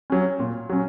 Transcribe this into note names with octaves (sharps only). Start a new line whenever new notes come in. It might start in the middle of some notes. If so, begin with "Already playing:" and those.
F#3 C#4
A#2
F#3 C#4